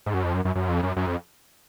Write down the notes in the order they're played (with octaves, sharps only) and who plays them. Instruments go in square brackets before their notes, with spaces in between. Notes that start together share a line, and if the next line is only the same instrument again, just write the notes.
[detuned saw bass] G#2
F#2
F2
F#2
F#2
F#2
F2
F#2
F#2
F2